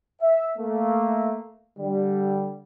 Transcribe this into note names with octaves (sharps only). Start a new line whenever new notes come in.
E5
A3 A#3
D3 G3